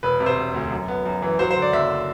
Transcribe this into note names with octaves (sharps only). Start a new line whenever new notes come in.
E1 B4
C3
C5
E1
D2
F#2
B3
F#2
E3
F#3 C5
C5
D3
D5
F#1 E5